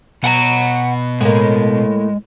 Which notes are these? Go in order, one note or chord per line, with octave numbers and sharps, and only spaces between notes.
B2 F#5 G#5 A#5
A2 G#3 A#3